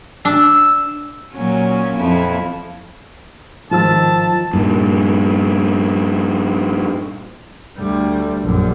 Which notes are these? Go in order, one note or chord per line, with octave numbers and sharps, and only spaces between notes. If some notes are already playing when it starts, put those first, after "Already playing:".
D4 E6
A#2 F#3 C#4
F2 E4
G#2 D#3 F3 F4 A5 E6
G2 A#2
D2 G3
A#1 F#2